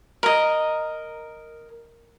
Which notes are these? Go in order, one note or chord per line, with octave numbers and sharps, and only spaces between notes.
A#4 D#5